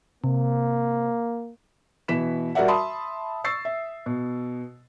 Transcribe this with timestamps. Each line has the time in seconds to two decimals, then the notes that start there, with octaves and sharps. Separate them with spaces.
0.24 C3 A#3
2.08 B2 E3 B6 E7
2.55 G3 F#4 A#4 D5 E5 F#5
2.68 E5 A5 B5 C6 D#6
3.44 C#6 E6 A6 C7
3.65 E5
4.06 B2